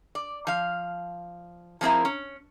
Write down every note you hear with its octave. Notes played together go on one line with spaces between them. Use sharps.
D5
F3 F5
F3 G#3 C4 D#4 E4 A#4
C#4